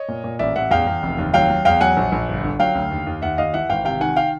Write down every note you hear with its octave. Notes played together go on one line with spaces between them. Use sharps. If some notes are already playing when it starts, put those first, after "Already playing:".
Already playing: C#5 D#5
A#2
A#2
A1 D5 E5
A1 E5 F#5
E2 F5 G5
E2
F1
D#2
F#3 F5 G5
F#3
E2 F5 G5
F#3 F#5 G#5
A#1
A#1
G1
D3
F#3 F5 G5
D2
D#2
D#2
D#2 E5 F#5
D#2 D#5 F5
E3 E5 F#5
G#1 F5 G5
C3 F5 G5
D#3 F#5 G#5
F5 G5